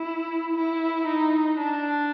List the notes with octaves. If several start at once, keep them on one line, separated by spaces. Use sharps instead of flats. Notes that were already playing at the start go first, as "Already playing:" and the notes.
Already playing: E4
E4
D#4
D4